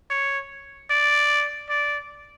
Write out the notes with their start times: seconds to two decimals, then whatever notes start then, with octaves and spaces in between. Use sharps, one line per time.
0.10 C#5
0.90 D5
1.69 D5